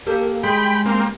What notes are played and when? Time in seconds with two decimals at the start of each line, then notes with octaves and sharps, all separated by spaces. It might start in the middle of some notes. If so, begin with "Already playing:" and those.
0.06 A#3 G4 A4
0.43 G#3 G5 B5
0.86 A#3 C4